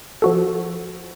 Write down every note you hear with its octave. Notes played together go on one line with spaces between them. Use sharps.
F3 F#4 A4